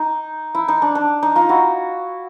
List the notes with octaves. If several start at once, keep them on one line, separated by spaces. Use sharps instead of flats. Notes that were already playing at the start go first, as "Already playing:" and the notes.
Already playing: D#4
E4
D#4
D4
D4
D#4
D#4 F4
E4 F#4